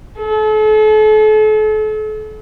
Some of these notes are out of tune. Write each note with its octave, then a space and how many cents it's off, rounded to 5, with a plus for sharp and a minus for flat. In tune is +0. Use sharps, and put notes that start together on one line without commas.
A4 -40